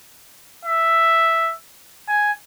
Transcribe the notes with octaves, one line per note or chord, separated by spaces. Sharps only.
E5
G#5